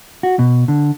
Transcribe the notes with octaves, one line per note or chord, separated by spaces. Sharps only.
F#4
B2
D3